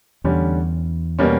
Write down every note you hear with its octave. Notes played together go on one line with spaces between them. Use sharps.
E2 D3 G3 C#4
B2 G3 A#3 C#4